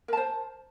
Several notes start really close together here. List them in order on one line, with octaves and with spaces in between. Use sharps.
A#4 A5 C5